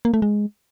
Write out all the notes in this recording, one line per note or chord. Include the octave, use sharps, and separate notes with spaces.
A#3
A3
G#3